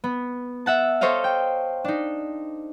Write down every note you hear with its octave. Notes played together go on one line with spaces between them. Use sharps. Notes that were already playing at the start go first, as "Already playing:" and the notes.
B3
E5 F#5 A5
A4 C5 C#5 D#5 F5
G5
D4 D#4